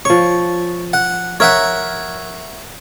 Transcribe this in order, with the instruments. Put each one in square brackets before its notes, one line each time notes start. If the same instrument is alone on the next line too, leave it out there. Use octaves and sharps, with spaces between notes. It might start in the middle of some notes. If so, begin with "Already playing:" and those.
[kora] F3 C#5 [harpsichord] C#6
[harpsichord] F#5
[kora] A#4 [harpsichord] C#5 E5 F#5